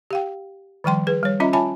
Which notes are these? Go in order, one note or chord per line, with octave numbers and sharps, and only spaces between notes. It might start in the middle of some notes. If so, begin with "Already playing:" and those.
G4 F5 G5
D#3 F3 G3 G5 C6
G#4 B4
G3 C#5
C#4 F4 D#5 E5 A#5 B5
F4 C#5 E5 G#5 A5 B5